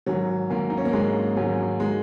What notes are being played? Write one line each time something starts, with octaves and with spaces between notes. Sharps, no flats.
G#2 D#3 F#3
G#2 D#3 A#3
D#4
C#4
A#3
G#2 D#3 G#3
G#2 D#3 F#3
D#3 G#3